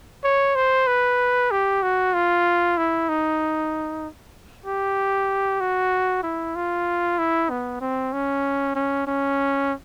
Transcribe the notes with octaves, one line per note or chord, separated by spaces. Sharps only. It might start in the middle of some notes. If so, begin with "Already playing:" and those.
C#5
C5
B4
G4
F#4
F4
E4
D#4
G4
F#4
E4
F4
E4
B3
C4
C#4
C#4
C#4